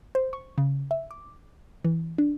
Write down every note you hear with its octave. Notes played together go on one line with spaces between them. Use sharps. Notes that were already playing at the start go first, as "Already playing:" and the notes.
C5
C#6
C#3
E5
D6
E3
D4